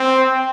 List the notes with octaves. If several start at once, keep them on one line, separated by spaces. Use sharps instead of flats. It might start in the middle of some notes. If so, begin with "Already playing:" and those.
Already playing: C4